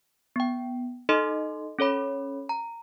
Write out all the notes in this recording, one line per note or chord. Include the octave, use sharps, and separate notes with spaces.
B3 G5
D#4 A4 D#5 C6
C#4 A4 C#5 B5
A#5